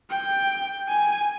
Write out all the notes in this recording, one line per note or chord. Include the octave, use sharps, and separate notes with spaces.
G5
G#5